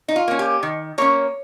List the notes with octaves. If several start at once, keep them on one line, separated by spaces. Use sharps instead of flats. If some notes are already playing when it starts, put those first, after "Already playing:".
D#4
F4
A#3 C#4
G4
D#3
A#3 C#4 C#5